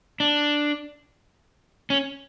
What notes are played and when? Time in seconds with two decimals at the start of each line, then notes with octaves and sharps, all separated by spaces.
0.20 D4
1.90 C#4